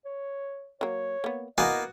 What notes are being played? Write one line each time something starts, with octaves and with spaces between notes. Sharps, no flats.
C#5
F#3 A#3 C#5
A#3 B3
E3 A#3 B3 F#4 D#5 F5 G#5